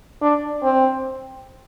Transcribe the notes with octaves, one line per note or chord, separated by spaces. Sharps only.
D4
C4